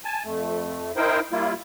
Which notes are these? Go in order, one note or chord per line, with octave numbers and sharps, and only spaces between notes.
G#5 A5
F2 A3
D#4 E4 A#4 C5 G5
G3 A#3 E4 F4